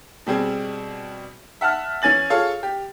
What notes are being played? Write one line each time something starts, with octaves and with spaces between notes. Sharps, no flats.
B2 G3 C4 G#4
E5 F#5 A5 F6
E3 C#4 G#5 A6 F#7
F4 G#4 A4 C#5 F5
G4